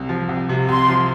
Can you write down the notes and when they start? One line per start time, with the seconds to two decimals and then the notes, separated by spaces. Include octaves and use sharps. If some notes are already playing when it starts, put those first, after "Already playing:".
Already playing: C2
0.09 F3
0.29 C2
0.49 C3
0.68 C2 C6
0.88 F3